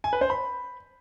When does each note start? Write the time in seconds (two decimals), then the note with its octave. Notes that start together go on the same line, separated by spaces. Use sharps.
0.04 G#5
0.13 B4
0.21 C5
0.30 B5